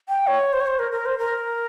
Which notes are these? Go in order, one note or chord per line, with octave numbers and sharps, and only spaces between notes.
G5
C#5
C5
C#5
C5
A#4
A#4
C5
A#4